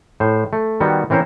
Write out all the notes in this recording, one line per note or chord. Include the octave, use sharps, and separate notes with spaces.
A2 C5
A3
D#3 G3 B3 F#4
E3 C4 C#4 A#4 C5